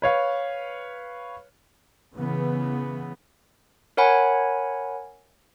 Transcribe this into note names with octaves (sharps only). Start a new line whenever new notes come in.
B4 C#5 F5
C#3 E3 B3
A#4 C#5 F#5 G#5 B5